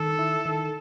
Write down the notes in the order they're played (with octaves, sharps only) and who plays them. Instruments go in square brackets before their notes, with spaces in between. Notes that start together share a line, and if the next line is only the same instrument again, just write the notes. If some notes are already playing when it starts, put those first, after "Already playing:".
Already playing: [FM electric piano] D#3 [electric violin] A4
[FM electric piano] E4
D#3